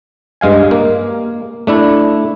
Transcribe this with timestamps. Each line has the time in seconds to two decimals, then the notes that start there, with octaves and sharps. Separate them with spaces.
0.41 G2 G#3 F5 G#5
0.71 A#3
1.67 A3 D4 E4